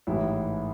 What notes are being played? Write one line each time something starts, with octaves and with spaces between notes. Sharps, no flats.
A1 G#2 E3 E4